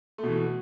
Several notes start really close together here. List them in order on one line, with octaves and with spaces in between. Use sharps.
A3 B2 E3